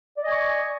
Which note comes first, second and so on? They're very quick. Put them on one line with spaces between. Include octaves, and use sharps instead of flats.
D5 D#5 G#5 C#6